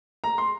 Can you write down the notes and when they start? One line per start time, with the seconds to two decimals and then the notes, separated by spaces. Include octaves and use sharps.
0.24 A#5
0.38 C6